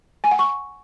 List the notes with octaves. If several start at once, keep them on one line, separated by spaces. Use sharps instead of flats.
G#5
F#5
C#6